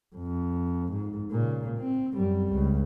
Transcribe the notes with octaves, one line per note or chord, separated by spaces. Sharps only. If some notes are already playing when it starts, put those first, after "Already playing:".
F2
G#2
A#2 C#3
C4
F#2 G3
C#2